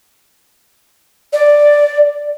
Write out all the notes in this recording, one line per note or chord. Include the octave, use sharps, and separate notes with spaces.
D5